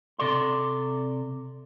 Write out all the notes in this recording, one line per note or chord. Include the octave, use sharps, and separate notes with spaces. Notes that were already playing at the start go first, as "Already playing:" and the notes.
C3 A4 D5 C6